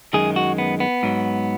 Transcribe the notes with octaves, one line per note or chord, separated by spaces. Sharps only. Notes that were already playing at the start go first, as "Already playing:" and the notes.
F#2 D#3 G#3 G#4
F#4
B3
B3
G#2 F#3